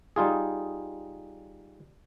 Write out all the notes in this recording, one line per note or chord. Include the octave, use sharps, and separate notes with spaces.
G3 D#4 F4 G#4